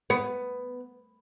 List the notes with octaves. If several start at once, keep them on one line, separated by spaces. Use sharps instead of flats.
B3